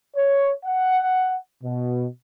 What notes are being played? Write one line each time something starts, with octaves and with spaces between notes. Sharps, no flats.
C#5
F#5
B2